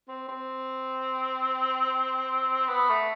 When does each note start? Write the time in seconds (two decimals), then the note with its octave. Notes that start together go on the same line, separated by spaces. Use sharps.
0.08 C4
0.29 C4
2.68 B3
2.89 A3